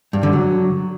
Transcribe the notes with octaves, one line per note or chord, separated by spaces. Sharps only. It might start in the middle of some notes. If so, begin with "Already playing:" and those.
G2
D3
F#3